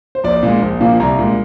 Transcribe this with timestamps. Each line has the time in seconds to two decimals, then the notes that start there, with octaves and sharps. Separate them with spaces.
0.15 C5
0.24 A#1 D5
0.43 A#2 G#3
0.62 A#1
0.80 A#2 F3 A#3
1.00 C2 A#5
1.19 A#2 G#3